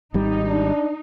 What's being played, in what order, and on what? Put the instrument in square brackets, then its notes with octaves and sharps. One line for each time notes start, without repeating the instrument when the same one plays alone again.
[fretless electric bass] G#1 G3 [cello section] D#4
[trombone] D4